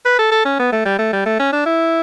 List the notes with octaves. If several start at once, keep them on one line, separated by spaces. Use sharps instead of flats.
B4
A4
A4
C#4
B3
A3
G3
A3
G3
A3
C#4
D4
E4